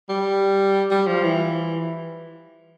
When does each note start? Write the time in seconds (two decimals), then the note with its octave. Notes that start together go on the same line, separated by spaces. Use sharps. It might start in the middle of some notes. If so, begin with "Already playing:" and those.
0.09 G3
0.91 G3
1.07 F3
1.23 E3